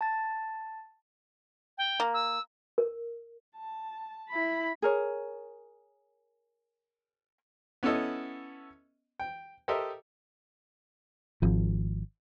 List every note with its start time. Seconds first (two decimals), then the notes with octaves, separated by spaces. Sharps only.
0.01 A5 A6
1.78 G5
2.00 A#3
2.14 E6
2.78 A#4
3.56 A5
4.29 E4 B5
4.82 G#4 A#4 C#5
7.83 B3 C#4 E4 A4 D#5
9.20 G5
9.68 G4 A4 A#4 C5 D#5 E5
11.42 G#1 F3